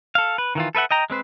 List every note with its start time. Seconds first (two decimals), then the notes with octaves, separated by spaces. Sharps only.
0.15 A4 F5
0.38 B4
0.55 D#3 E3 F4
0.75 A4 B4 E5 F#5
0.91 D#5 G5 A#5
1.10 G#3 C4 B4 C5